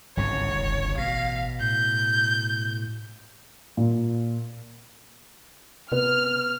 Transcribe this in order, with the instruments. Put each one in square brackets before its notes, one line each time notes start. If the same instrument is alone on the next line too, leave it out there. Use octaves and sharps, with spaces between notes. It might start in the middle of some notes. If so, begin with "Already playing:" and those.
[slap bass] G1 C2 C#3 [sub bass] G#2 [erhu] C#5
[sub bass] F1
[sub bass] A1 [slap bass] B2 [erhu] F5
[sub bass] A2 [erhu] G6
[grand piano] A#2
[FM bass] C3 [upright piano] B3 [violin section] F6